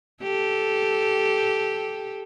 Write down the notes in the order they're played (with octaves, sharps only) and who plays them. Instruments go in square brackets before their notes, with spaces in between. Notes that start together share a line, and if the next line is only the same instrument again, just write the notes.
[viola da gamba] G4 A4